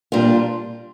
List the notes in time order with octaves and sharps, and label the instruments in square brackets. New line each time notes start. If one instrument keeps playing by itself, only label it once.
[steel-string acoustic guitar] A#2 G3 D4 F4